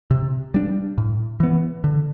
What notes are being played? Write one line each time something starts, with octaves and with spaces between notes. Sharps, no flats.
C3
G3 D4
A2
E3 B3
D3